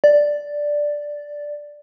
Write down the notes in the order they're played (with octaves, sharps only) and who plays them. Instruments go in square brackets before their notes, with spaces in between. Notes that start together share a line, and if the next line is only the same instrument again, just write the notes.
[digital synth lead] D5